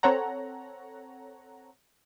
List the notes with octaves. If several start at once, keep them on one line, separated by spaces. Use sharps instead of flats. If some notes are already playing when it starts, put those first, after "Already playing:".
C4 A4 C#5 F#5 A#5